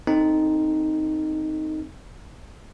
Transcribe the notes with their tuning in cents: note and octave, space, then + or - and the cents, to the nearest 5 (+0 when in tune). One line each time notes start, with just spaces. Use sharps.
C4 +0 D#4 +0 A4 +10